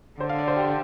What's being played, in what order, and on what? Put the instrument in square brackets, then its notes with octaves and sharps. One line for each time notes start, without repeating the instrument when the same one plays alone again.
[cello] D3 [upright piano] C5
[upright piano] F5
D5
C5
G4